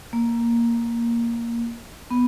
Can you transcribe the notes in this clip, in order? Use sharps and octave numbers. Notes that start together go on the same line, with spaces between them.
A#3
B3